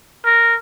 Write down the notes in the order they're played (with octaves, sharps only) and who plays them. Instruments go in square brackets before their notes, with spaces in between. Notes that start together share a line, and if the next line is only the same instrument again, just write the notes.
[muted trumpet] A#4